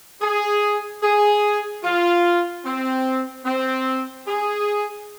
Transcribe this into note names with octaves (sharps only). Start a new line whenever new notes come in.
G#4
G#4
F4
C4
C4
G#4